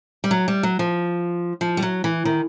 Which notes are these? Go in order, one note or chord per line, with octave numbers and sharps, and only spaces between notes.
G3
F#3
G3
F#3
F3
F3
G3
F#3
E3
D#3